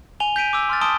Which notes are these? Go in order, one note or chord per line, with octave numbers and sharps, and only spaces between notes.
G#5 F7 G7
G6 B6 D7 D#7
D6 E6
C6 F6 A6
A5 C6 D#6 D7 G7